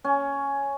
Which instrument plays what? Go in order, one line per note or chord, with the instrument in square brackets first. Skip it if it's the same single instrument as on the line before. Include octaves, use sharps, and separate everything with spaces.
[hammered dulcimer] C#4